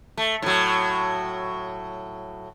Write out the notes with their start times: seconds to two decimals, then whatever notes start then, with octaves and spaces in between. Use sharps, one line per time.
0.17 A3
0.42 A2 F#3